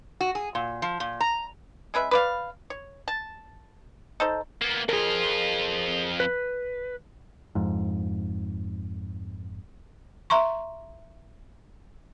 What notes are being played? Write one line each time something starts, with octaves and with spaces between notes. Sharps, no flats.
F#4
G#4
A#2
F3
A#2
A#5
G#3 C#4 B4 E5
B4 D5 F5
C#5
A5
D#4 A4 C5
A#3 B3
F2 F4 G#4 A#4
B4
F2 G#2
E5 A#5 C6 C#6